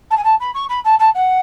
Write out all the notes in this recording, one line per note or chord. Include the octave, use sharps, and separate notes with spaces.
A5
G#5
A5
B5
C#6
B5
A5
A5
F#5